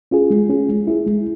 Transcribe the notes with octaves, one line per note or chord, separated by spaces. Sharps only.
C#4 F4 G#4
G#3
C#4 F4 G#4
G#3
E4 G#4
G#3